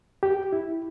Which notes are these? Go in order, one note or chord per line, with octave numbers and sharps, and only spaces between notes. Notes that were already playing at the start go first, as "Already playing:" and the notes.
G4
E4